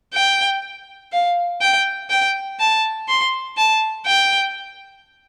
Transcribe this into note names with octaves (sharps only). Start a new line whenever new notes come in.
G5
F5
G5
G5
A5
C6
A5
G5